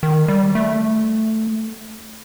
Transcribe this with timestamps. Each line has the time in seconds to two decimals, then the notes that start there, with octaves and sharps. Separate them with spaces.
0.03 D#3
0.28 G3
0.55 A3